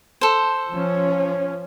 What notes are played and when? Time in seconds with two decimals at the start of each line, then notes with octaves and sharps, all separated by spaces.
0.21 A4 C5
0.72 F3 C#4